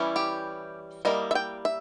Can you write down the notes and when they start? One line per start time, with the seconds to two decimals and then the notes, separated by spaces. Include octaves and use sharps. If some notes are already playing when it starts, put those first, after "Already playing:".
Already playing: E3 G3 C#4 E4
0.16 G4
1.05 G3 A#3 E4 D#5
1.31 E5
1.35 G5
1.65 E5